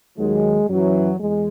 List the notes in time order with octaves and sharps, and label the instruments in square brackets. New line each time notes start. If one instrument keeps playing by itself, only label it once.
[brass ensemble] D#2 D#3 F#3 G#3
F#2 E3 F#3
E2 G#3